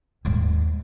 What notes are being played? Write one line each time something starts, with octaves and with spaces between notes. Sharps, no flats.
D#2 G#2